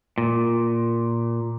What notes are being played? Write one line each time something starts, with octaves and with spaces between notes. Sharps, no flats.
A#2